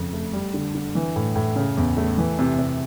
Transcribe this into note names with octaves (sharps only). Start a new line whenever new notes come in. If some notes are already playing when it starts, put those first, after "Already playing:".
Already playing: F2 C#3
A3
G3
D3
D3
E3
A2
A2
C#3
E2
A3
E3
C3
C3